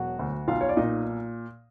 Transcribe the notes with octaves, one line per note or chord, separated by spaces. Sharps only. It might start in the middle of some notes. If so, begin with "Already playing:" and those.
Already playing: E1 F#3 F#4 F#5
D2
B1 F4 F5
C#5
D5
A#2 D#4 D#5